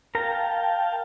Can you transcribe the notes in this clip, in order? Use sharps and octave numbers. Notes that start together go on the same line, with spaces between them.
A#4 F5 G5 A5 A#5